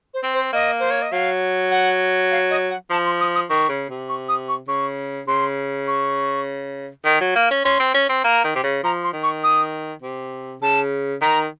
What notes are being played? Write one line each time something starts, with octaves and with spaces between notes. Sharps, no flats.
C5
C4
C5
A#3 D#5
C5
C#5
D#5
F#3 F5
F#5
F5
D#5
F#5
F3 A5
C6
D#6
D#6
D#3 C#6
C#3
C3
C#6
D#6
C#6
C#3 C#6
C#3 C6
C#6
D#3
F#3
A#3
C#4
C#4 C6
C4
C#4
C4
A#3 A#5
D#3
C3
C#3
F3 A#5
C6
D#3
C#6
D#6
C3
C#3 A5
D#3 A#5